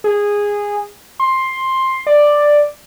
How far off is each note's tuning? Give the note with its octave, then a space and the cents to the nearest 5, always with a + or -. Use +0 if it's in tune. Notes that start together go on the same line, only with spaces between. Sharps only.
G#4 -15
C6 +10
D5 +5